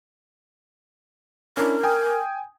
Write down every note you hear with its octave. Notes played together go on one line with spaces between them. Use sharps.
C#4 D4 E4 A#4
G5 G#5 D#6